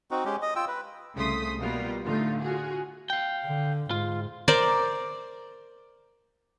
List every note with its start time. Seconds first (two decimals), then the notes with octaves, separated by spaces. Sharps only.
0.11 C4 D#4 F#4
0.25 G#3 C#4 G4
0.42 D#5
0.56 F4 G5 E6
0.68 B4
1.14 C2 C#3 A3 C6 D#6 B6
1.60 B2 G3 A#3 B3 F4 A#4
2.05 A2 D3 A3 D#4 F4
2.41 F4 F#4 G#4
3.10 F5 G5
3.45 D3
3.91 G#2 F4
4.48 A#4 C5 D5 D6